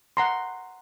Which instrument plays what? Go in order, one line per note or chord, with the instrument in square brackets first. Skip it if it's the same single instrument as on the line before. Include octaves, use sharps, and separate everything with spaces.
[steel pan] F#5 A#5 C6